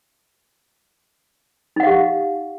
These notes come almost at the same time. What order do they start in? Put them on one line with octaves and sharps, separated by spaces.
D#4 F#5 F5 G4